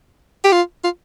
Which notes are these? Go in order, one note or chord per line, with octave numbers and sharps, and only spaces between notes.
G4
F4
F4